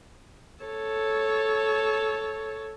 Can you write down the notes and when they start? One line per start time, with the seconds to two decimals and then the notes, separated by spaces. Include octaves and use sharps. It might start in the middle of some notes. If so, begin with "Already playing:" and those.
0.64 A4 C#5